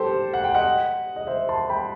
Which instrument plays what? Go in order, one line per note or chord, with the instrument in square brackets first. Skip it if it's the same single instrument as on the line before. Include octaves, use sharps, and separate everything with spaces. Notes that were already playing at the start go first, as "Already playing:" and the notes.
Already playing: [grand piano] G4 A4 C5
F#5
G5
D#5 F#5
D#5
C5 E5
A5 C6
G5 B5